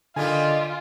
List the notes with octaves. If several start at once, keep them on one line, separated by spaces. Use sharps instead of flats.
D3 G3 A#3 D#4 F4 G#5